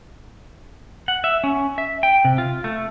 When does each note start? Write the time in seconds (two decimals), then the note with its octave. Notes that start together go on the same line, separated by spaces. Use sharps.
1.08 F#5
1.24 E5
1.44 C#4
1.78 E5
2.03 G5
2.25 C3
2.38 F4
2.64 A3